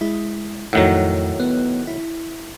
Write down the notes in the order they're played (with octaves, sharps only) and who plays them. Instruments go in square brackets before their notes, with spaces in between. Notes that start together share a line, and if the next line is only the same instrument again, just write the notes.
[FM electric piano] G#3 E4
[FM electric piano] F2 A3 F#5 [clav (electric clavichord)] A2 D#3 F#3
[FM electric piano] B3
E4